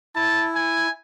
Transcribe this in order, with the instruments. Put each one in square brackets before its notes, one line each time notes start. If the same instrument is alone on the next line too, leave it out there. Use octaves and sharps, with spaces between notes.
[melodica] E4 [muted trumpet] A5
[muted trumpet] G#5